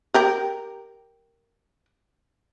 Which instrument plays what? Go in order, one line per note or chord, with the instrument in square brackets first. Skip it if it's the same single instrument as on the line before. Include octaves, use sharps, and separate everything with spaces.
[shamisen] G4 A#4 G5